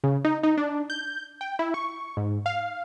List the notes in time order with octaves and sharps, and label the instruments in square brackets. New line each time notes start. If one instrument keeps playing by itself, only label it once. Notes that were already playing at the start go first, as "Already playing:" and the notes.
[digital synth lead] C#3
D#4
D#4
D4
G6
G5
E4
C#6
G#2
F5